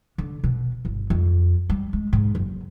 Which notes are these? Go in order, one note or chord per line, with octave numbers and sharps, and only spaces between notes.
D3
B2
G1
F2
G3
G#3
G#2
F#1